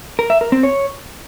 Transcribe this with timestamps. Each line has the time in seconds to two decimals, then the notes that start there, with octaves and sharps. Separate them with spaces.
0.19 A#4
0.30 E5
0.41 A#4
0.52 C4
0.63 C#5